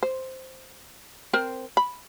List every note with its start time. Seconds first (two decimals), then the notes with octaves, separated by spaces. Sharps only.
0.03 C5
1.33 C4 A#4 C5
1.77 B5